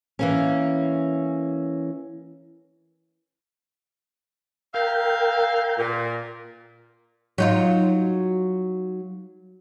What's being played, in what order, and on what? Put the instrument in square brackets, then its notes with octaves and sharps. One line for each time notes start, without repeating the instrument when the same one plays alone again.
[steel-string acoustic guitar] E3 A#3 C#4
[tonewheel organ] A#4 G5 [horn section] E5 F5
[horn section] A#2
[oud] F#3 D#4 F4